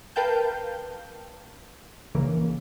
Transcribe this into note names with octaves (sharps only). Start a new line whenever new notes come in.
A#4 B4 F5 G5 A5 G6
A#1 C#3 E3 A#3